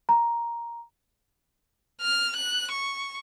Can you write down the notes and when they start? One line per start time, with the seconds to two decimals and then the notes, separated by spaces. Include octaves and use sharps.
0.09 A#5
2.01 F6
2.36 F#6
2.71 C#6